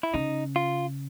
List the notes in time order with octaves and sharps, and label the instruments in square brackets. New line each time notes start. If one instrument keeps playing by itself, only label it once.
[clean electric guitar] E4
[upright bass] C#3 [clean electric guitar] D#4
[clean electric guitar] F4